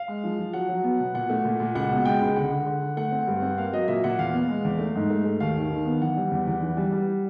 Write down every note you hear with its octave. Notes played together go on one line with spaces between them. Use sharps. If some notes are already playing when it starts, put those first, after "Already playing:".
Already playing: F5
G#3
F3
F3
F#3 F#5
F#3
B3
B2
A#2 F#5
A3
A#2
A#2
C#2 F#5
B2
G#3 G5
C#2
D3 F#5
D3
D3
D3
A3 F#5
C4
G2
C4
A#3 F5
F#3 D#5
A#2 E5
A#2 F#5
E2 F5
B3
G#3
E2
A3
G#2
A3
A3
D#2 F5
D#3
D#3
B3
E3 F#5
G3
E2
E2
E3
G3
G3